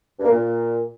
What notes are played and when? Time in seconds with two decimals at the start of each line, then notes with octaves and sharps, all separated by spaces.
0.19 G2
0.25 A#3
0.30 A#2